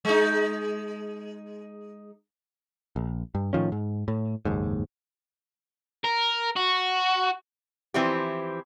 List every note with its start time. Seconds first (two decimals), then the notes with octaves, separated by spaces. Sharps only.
0.05 G#3 D#4
2.96 A#1
3.35 G2
3.53 A2 D#3 F3 C#4
3.72 G#2
4.08 A2
4.45 F#1 D#2 G#2
6.04 A#4
6.56 F#4
7.94 E3 F3 C4 E4 G4